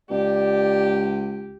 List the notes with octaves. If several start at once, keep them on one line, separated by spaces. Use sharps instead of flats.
C#2 G4 D5